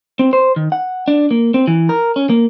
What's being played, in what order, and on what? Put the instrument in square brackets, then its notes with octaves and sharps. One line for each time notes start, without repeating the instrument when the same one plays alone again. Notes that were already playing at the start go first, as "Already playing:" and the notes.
[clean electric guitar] C4
C5
D#3
F#5
D4
A#3
C4
E3
A#4
C#4
A#3